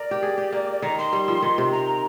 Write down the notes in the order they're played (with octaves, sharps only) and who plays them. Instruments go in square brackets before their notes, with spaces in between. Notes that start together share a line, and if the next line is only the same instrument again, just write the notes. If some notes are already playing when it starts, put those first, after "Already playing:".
Already playing: [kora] A#4 [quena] D5
[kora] G4
G#4
G4
A#3
[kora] D#3 [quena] A#5
[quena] C6
[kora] G3
F3
D#3
C3
[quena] A#5